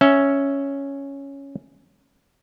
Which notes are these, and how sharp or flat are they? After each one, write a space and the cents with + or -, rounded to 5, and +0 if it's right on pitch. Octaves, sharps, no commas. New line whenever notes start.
C#4 +0 E5 +0